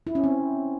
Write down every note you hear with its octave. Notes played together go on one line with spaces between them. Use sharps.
E4
C#4
C4